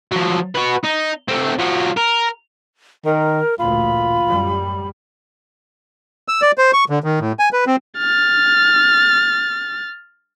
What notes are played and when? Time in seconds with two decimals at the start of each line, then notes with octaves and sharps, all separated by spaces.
0.12 F3 F#3
0.55 F#4 B4
0.84 D#4
1.28 A3 C4
1.59 F3 F#4
1.97 A#4
3.05 D#3 A#4
3.59 A1 D2 A#2 F4 B5
4.27 F#2 G3
6.28 E6
6.42 D5
6.58 C5
6.73 C#6
6.90 D3
7.04 D#3
7.20 A2
7.39 G#5
7.53 B4
7.67 C4
7.98 F6 A6